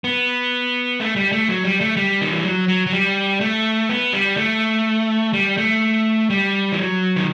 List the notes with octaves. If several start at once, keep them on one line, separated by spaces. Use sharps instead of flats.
B3
A3
G3
A3
F#3
G3
A3
G3
D#3
E3
F#3
F#3
F#3
G3
A3
B3
G3
A3
G3
A3
G3
E3
F#3
D#3